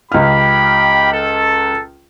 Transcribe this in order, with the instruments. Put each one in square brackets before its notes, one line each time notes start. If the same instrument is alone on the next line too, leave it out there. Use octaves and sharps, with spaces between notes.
[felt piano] C#2 F6 [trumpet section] G4 G5 B5
[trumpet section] A4